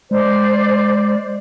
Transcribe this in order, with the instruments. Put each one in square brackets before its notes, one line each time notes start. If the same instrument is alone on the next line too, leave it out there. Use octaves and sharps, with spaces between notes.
[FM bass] G#3 [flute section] C5 D5